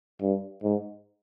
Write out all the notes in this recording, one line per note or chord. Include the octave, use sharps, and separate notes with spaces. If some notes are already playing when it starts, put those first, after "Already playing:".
G2
G#2